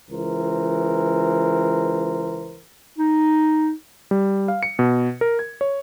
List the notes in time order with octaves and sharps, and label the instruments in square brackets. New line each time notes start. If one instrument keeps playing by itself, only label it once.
[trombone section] C#2 E3 A#4 C5
[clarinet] D#4
[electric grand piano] G3
F5
C#7
B2
A#4
G#6
C#5